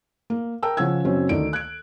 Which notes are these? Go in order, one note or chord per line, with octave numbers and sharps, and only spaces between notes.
A#3
A#4 G5 A5 E6
C#3 F3 C#4 F#5 E6 G#6
F#1 F#3 C4 C#4
D2 D#3 D5 D7
F#6 G#6 D7